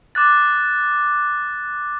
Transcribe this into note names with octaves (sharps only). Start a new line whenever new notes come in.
D6 F#6 A6